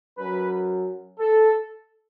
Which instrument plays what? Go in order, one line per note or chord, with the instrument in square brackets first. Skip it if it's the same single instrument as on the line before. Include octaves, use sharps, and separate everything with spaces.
[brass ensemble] F#2 F#3 B4
A4